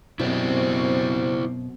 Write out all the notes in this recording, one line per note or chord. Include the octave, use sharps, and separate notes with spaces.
F#2 B2 C4 E4 C5 D5